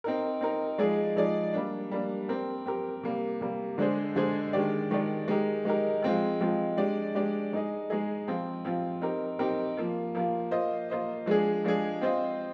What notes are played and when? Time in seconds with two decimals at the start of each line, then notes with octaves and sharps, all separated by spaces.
0.04 C4 D#4 A#4
0.41 C4 D#4 A#4
0.78 F3 G#3 D#4 G#4 D5
1.16 F3 G#3 D#4 G#4 D5
1.53 G3 A#3 D4
1.91 G3 A#3 D4
2.28 C4 G4 A#4
2.66 C4 G4 A#4
3.03 C3 G3 A#3
3.41 C3 G3 A#3
3.78 D3 G#3 D4 G#4 C5
4.16 D3 G#3 D4 G#4 C5
4.53 D#3 G#3 D4 G4 D5
4.91 D#3 G#3 D4 G4 D5
5.28 G#3 D#4 G4 A#4
5.65 G#3 D#4 G4 A#4
6.02 F3 G#3 C4 F4
6.41 F3 G#3 C4 F4
6.77 G#3 D4 G4 D5
7.15 G#3 D4 G4 D5
7.53 G#3 D#4 G#4 D#5
7.90 G#3 D#4 G#4 D#5
8.28 F3 C4 F4
8.65 F3 C4 F4
9.02 C4 D#4 G4 A#4
9.39 C4 D#4 G4 A#4
9.77 F3 A#3 F4
10.15 F3 A#3 F4
10.51 A#3 F4 C5 D#5
10.90 A#3 F4 C5 D#5
11.26 F3 G#3 D4 G#4
11.64 F3 G#3 D4 G#4
12.01 C4 F4 C5 D#5